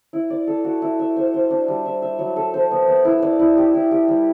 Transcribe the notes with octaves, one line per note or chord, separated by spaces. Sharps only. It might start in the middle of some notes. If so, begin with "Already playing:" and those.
E4
D5
A4
F#4
E4
E5
C5
C5
D4
G3
E5
E5
F#3
A4
C5
B3
B3
E4
D5
E4
G4
E4
G4
G3